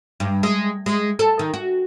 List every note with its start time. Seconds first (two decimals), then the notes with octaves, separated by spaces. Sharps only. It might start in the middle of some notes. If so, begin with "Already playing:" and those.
0.20 G2
0.43 G#3
0.86 G#3
1.19 A4
1.39 D#3
1.54 F#4